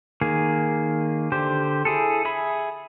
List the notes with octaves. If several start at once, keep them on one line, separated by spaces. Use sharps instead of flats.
D#3 A#3 G#4
D3 G4 C5
E4 G#4 A4
G#4 E5 B5